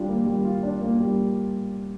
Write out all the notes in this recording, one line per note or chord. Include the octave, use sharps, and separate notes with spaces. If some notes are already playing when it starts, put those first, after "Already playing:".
Already playing: G3 D4 F4
A#3
G3
F4
D4
A#3
G3